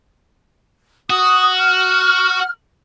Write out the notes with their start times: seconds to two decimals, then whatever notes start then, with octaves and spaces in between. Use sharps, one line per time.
1.10 F#4 D#6
1.56 F6